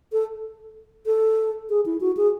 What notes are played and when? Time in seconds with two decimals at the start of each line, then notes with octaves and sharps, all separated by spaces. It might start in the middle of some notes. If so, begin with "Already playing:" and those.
0.13 A4
1.06 A4
1.70 G#4
1.86 E4
2.01 F#4
2.17 G#4